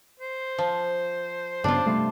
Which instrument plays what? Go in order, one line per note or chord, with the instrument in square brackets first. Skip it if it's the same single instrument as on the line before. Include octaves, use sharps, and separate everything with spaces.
[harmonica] C5
[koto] F3
[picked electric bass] G2 C#3 B3 [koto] D4 F4
[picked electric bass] C3 G3 A3